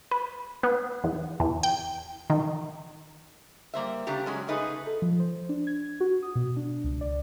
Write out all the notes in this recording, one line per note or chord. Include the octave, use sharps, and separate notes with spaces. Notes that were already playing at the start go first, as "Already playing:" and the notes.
B4
B3
E2
E2
G5
D#3
G3 A#3 C5 E5
C#3 A3 D4 G4 A#5
F#3 G#3 C#4
C#3 A3 D#4 G#4 B4
A4
F3
C5
D4
G#6
F#4
D#6
B2
D4
C#2
D5